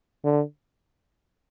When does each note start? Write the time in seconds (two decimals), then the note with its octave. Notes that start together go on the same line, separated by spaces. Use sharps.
0.24 D3